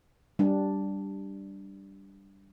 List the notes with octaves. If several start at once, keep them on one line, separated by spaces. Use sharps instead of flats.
G3 D4